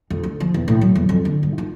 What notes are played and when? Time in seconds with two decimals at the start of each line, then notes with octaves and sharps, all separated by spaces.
0.10 F2
0.23 D2
0.40 F3
0.54 E2
0.68 A2
0.81 F#3
0.95 E2
1.09 F2
1.25 D3
1.43 G2
1.58 F4